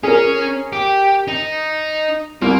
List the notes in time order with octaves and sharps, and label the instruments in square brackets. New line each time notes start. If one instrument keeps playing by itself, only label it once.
[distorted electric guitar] C#4 [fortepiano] G#4 A#4
[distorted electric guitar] G4
D#4
[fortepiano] C2 [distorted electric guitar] A#3